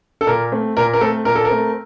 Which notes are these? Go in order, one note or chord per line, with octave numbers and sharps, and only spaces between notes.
A4
A#2 A#4
A3 C4
A#2 A#4
A#4
A3 C4 A4
A#2 A#4
A4
A#4
A3 C4